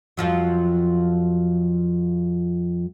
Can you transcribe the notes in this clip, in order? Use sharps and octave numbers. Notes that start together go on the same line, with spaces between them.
F2 F3 F#3